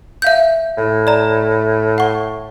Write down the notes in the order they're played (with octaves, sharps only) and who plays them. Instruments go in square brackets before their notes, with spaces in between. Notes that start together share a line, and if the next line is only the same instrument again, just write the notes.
[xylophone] E5 F5 G6
[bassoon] A2
[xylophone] D5 A#5
F#5 C#6